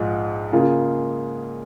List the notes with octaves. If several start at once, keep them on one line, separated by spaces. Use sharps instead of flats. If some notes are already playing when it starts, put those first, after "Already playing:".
Already playing: A#1 G#2 G#3 F4 G#4
C#3 A#3 F4 G#4